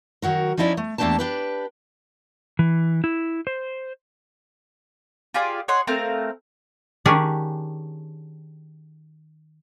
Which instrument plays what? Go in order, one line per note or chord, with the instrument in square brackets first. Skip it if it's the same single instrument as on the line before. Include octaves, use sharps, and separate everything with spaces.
[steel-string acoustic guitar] D#3 F#3 F#4 A#4
F3 C#4 D#4 E4 C#5 D5
A3
E2 A3 A#3 D4 G4 A5
D4 G4 B4
[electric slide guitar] E3
E4
C5
[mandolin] F4 G4 G#4 D5
C#5 D#5 F#5 C6
A3 C4 A#4 F5
[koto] D#3 C#4 D4 G4 G#4 D5